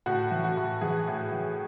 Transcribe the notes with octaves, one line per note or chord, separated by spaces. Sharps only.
A2 F#4
E3
F#4
A2
E3 G#4
A2
E3